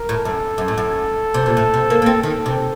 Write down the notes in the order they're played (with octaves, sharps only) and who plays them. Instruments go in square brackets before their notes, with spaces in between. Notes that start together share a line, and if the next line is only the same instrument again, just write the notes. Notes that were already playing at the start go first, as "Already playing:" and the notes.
Already playing: [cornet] A#4
[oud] A2
[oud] F#2 [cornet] A4
[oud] F#2
A2
F#2
C3
A#2
A2
C3
A#3
A#3
C4
[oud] D#3 [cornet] A4
[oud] C3